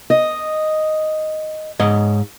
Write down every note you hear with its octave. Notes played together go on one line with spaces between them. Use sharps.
D#5
G#2 C#5 D#5